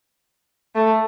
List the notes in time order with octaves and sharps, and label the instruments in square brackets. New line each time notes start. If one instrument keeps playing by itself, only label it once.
[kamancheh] A3